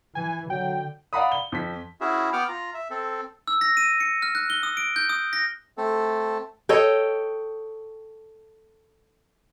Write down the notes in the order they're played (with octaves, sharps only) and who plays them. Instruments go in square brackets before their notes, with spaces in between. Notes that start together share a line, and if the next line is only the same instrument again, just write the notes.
[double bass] E3 [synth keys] G#5
[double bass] D3 [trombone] F#3 [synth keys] G5
[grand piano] D5 F5 F#5 A#5 B5 D#6
G7
F2 B6
[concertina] C#4 E4 F#4 G#4 E5
B3 F#5 G5 D6 F6
F4 A#5
E5
C4 A4
[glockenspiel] E6
A#6
D#7
C#7
F6
F#6
G7
D#6
D7
G6
D#6
A#6
[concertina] A3 C4 A4
[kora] A4 C#5 D#5 G5